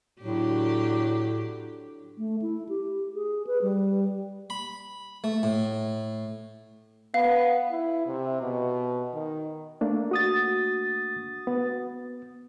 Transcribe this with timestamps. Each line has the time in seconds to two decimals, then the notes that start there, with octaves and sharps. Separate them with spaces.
0.22 A2 D3 F#3 G4
2.18 A3
2.42 E4
2.69 G4
3.15 G#4
3.47 B4
3.62 G3
4.50 B5
5.24 A3
5.43 A2
7.14 B3 F5
7.71 E4
8.07 C3
8.41 B2
9.13 D#3
9.81 A3 A#3 D4
10.11 F#4 D#6 A6
11.47 B3